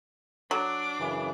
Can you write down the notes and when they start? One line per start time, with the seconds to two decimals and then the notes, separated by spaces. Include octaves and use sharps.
0.51 F#3 D4 D6
0.99 F#2 C#3 E3